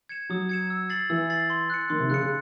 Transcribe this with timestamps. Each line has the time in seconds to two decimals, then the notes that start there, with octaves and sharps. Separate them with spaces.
0.09 G#6 C#7 E7
0.29 F#3 D#6
0.49 G#6 C#7 E7
0.70 E6
0.90 A6 C7 F#7
1.10 E3 E6
1.30 A6 C7 F#7
1.50 C6
1.70 F#6 C#7
1.90 D#3 C6
2.00 C3
2.10 C#3 F#6
2.14 C#7
2.20 C#3